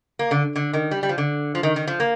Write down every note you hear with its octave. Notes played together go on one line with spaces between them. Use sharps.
A#3
D3
D3
D#3
G3
G3
F3
D3
F3
D#3
D#3
F3
A#3